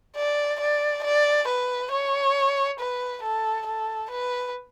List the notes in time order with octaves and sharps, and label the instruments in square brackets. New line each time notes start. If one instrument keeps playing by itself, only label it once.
[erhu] D5
D5
D5
B4
C#5
B4
A4
A4
B4